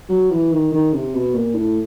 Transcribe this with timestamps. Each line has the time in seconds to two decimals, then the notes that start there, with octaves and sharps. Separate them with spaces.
0.09 F#3
0.30 E3
0.52 D#3
0.71 D#3
0.93 C3
1.14 B2
1.35 A#2
1.55 A2